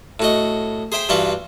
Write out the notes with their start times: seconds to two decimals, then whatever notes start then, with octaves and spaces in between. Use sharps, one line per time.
0.20 A2 F#4 D#5
0.92 G#4 C5 E5 G5 G#5
1.09 G2 E3 F4 F#4 B4